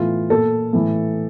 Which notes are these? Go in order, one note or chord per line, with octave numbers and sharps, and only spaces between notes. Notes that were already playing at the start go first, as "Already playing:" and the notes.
Already playing: A2 E3 F4
A#2 A4
A2 E3